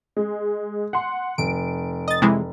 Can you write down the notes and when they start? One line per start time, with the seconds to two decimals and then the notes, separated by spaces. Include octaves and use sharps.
0.17 G#3
0.93 F#5 C6
1.38 F1 D7
2.08 D#5 A6
2.22 C3 E3 G#3